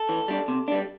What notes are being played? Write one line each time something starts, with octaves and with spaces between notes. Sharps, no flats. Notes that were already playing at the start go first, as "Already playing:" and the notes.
Already playing: A4
E3
G3 D4
C3
G3 D4